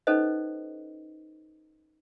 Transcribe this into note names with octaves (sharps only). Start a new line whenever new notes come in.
C#4 D#4 A4 B4 C5 D#5